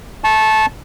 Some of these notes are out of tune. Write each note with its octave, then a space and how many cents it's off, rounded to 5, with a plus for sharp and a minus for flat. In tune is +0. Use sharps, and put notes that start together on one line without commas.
A5 -15 C#6 -25